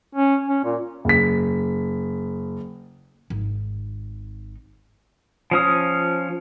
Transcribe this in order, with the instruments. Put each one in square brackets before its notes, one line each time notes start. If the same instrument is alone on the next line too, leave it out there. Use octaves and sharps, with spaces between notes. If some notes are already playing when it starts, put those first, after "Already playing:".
[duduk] C#4
C#4
A#2
[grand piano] F#1 B6
[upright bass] G#1 D#4
[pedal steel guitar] F3 C#4 D#6